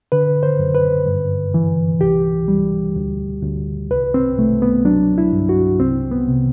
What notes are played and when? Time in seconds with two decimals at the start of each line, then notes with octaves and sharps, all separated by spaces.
0.12 D3 B4
0.43 C5
0.59 F#2
0.75 B4
1.06 G2
1.54 E3
2.01 C2 G4
2.48 G3
2.96 D2
3.43 D2
3.91 C2 B4
4.14 C4
4.38 C2 A3
4.62 B3
4.85 F#3 D4
5.18 E4
5.33 G2
5.49 F#4
5.80 C2 C4
6.11 B3
6.28 C3